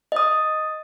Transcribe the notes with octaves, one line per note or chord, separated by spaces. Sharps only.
D#5 D#6